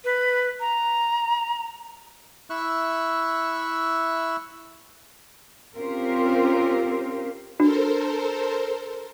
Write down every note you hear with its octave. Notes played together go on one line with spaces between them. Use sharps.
B4
A#5
E4 E5 C#6 E6 F#6
C4 C#4 F4 G4 A#4 C5
D4 F#4 A4 A#4 C5